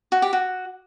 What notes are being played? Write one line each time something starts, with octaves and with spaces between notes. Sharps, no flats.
F#4
G4
F#4